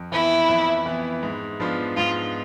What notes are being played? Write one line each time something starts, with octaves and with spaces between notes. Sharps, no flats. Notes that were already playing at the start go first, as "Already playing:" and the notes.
Already playing: F2
E3 B3 E4
F2
E3 B3
G#2
F3 B3 D4 F4
G#2 F4